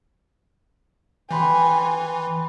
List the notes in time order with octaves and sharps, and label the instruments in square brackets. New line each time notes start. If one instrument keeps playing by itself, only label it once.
[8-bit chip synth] E3 [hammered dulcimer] G5 B5 C6 [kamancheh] G#5